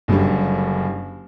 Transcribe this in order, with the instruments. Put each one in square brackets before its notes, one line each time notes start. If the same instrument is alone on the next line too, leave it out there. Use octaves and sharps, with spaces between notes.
[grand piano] F#1 F#2 D3 G3